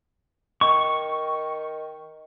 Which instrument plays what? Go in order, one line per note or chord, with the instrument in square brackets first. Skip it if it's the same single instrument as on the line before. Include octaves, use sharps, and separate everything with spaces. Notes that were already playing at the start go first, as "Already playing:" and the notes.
[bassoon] D#3 [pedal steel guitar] C#6